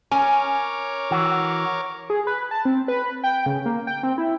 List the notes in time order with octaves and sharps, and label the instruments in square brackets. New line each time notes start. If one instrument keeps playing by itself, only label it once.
[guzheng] C#4 [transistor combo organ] A#4 C#5 D6 [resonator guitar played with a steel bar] G#5
[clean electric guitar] E3 F#4
[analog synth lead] G#4
B4
A5
C4
B4
G5
C#3
A#3
G5
C4
E4